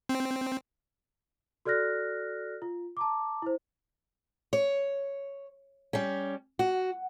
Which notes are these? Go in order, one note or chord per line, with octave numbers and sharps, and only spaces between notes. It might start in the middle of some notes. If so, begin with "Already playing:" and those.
C4
F#4 A4 D5 F6 F#6 A#6
F4
A5 A#5 D6
E4 C5
C#5
G3 C#4
F#4